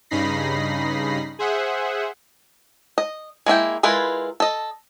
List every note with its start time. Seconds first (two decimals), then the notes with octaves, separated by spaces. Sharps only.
0.10 G2 C#3 D#4 B5 A#6 C7
1.39 G#4 C5 E5 F#5
2.98 D#5
3.46 G#3 A#3 E4 G5
3.83 G#3 E4 F4 A#4 B4
4.40 A4 D#5